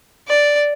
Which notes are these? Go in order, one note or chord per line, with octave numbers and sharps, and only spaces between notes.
D5